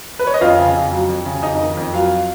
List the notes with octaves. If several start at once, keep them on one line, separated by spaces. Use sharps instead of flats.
B4
C#5
D#5
F2 F4 F5
C#3
F2
F#3
F2
C#3
F2 D#4 D#5
D#3
F2
F#3 F4 F5